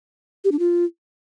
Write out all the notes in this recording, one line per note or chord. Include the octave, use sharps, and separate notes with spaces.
G4
D4
F4